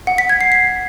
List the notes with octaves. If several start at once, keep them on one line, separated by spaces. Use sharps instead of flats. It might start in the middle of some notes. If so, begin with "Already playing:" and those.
F#5
B6
G#6
C7
C7